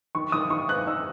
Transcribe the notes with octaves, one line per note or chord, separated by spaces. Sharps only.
D#3 C#6
D#3 D#6
D#3 C#6
B4 F#6
D#4 E6